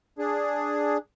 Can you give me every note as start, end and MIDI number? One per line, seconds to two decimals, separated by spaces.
0.19 0.98 62
0.19 0.98 68